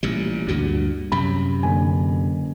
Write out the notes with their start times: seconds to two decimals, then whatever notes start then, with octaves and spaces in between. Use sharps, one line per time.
0.03 A1 A#2 G3
0.48 D2 G2 A#2 F#4
1.12 F#2 C3 B5
1.63 F#1 D3 G#5